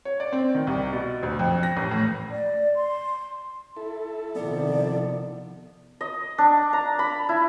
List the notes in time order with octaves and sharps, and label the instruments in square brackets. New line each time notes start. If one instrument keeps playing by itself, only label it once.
[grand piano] C#5
D5
C4
D#3
C2
B2
D2
F2
A#6
A1
A2
[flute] D5
C6
[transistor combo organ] E4 A4
[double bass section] C3 D#3 F3 [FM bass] B3 [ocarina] D5
[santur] D#5
D4
A#5
B5
E4